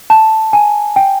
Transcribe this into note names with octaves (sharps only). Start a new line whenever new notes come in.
A5
G#5
G5